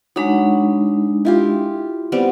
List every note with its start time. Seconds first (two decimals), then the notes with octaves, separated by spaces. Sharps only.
0.16 F#3 G#3 D4 D#4 B5
1.25 E4 F4 G4
2.12 G3 B3 C4